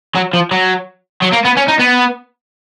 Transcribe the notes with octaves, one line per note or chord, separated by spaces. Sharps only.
F#3
F3
F#3
F#3
A#3
B3
C#4
D#4
B3